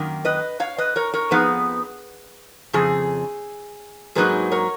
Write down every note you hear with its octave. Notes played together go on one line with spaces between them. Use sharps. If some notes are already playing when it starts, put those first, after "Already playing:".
Already playing: F#2 D#3 A#3
B4 D#5
C#5 F5
B4 D#5
A#4 C#5
A#4 C#5
F2 F3 B3 D#4 G#4 B4
F2 C#3 G#4
G#2 F#3 A#3 D#4 G#4 B4
A#4 C#5